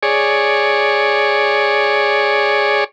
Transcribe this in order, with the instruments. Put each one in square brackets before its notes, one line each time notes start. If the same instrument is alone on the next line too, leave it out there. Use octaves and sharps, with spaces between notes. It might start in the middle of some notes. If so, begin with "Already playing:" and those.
[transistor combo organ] G#4 C#5 D5